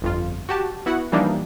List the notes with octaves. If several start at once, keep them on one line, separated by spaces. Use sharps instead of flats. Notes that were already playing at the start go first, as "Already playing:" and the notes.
G1 F2 F4
F#4 G4 A5
B3 E4 F#4 F#5
E3 F3 G3 A#3 D4 D#4